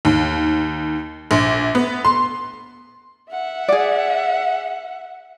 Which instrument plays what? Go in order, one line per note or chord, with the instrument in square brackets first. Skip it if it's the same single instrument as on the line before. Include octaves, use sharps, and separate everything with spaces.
[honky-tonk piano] D#2
A#1
B3
C6
[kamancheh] E5 F#5
[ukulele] G#4 D5